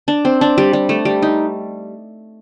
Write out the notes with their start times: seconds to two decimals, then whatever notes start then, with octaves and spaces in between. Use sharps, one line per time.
0.08 D4
0.25 C4
0.41 D4
0.58 G3
0.73 G3
0.89 A3
1.05 G3
1.22 D#4